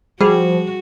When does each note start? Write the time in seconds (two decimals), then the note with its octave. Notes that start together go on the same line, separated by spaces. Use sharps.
0.21 F3 G3 F#4 G#4